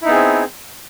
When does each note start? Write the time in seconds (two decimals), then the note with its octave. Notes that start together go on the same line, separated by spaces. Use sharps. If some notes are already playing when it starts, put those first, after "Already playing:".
0.02 E4
0.05 D#4
0.08 B3
0.11 G#4
0.14 C4